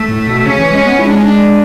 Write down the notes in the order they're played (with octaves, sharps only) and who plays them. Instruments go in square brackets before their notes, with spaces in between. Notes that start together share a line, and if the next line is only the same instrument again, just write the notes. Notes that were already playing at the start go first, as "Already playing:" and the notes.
Already playing: [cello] A3
[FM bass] A2
B2
[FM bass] C#3 [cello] C#4
[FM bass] E3
G#3
B3
[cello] G#3 [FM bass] E4
[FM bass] D4
C#4
D4